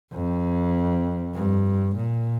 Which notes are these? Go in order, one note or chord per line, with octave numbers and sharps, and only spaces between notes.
F2
G2
A#2